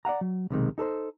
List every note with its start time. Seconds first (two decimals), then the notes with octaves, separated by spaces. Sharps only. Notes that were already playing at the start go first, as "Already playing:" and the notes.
0.05 D5 F5 F#5 A#5
0.21 F#3
0.50 B1 C3 D#3 G#3
0.78 D#4 A4 A#4 C5